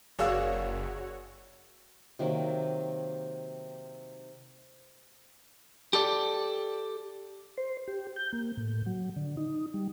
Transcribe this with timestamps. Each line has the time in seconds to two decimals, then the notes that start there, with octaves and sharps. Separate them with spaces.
0.19 F#1 F#4 G#4 A#4 C#5 D5 F5 E6
2.19 C3 D#3 F#3 A#3
5.93 G4 A4 D5
7.58 C5
7.88 G4
8.16 G6
8.33 A#3
8.57 A2
8.86 F#3
9.16 D3
9.37 D#4
9.74 G3